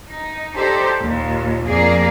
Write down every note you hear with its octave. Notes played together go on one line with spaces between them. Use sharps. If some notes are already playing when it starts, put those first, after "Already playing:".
D#4
D#4 G4 A4 C5 D5
D#2 A#2
F2 A#3 G#4 A#4 D5 F5